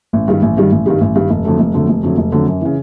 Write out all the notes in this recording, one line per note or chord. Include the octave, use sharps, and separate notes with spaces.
A1
G2 D#3 G3
A1
G2 D#3 G3
A1
G2 D#3 G3
A1
G2 D#3 G3
F1
F2 D3 F#3 A3
F1
F2 D3 F#3 A3
F1
F2 D3 F#3 A3
F1
F2 D3 F#3 A3
F#2
C#3 E3